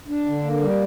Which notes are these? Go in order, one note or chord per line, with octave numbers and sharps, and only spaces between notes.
D4
D3
A#3
G3